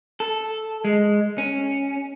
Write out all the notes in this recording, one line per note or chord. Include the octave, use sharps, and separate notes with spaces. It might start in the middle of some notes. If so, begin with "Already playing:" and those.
A4
G#3
C#4